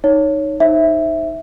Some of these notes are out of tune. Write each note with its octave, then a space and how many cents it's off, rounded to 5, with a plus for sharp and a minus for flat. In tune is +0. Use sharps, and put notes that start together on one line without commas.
D#4 -5 C#5 +5
D#4 +0 C5 +20 E5 +0